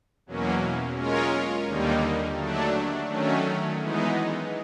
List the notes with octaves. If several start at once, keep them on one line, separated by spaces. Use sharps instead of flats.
E2 B2 F#3 A#3 C#4
G#3 C#4 F4 A#4 C#5
D#2 D3 G3 A#3 D#4
F#3 A3 D4
D#3 F#3 A3 C#4
E3 G#3 B3 D#4